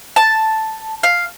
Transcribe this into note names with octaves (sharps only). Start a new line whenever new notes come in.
A5
F5